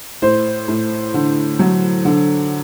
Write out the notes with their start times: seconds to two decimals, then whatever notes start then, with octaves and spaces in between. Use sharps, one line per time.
0.22 A2 C5
0.68 A2
1.14 D3
1.59 F#3
2.05 D3